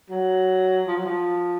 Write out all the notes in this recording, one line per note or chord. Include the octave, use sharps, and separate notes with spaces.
F#3
F3
F#3
F3